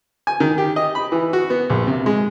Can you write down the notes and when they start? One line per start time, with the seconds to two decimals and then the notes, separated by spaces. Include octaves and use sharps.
0.27 G#5
0.40 D#3
0.58 G4
0.76 D#5
0.95 B5
1.12 E3
1.33 F#4
1.50 B3
1.70 A#1
1.87 C3
2.06 G#3